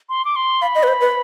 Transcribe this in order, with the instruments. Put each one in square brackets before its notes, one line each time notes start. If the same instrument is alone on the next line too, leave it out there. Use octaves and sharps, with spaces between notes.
[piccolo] C6
D6
C6
[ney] F5 [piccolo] B5
[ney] D#5
B4
C5
B4